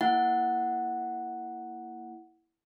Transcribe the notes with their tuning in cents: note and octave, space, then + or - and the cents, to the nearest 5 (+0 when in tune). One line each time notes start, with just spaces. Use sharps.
A#3 +0 E4 +0 F#5 +0